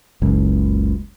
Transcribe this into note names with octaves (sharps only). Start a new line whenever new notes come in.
F#1 C#2